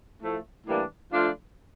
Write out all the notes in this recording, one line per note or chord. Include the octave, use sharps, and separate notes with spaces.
A2 F3 A3
A2 E3 G3 A#3 D4
F3 A3 D4 F4